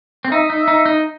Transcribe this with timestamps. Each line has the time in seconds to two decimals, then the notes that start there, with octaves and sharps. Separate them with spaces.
0.25 C4
0.31 D#4 E5
0.50 D#4
0.68 D#4
0.86 D#4